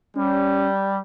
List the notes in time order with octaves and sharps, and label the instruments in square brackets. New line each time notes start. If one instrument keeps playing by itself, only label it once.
[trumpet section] G3 [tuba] C#4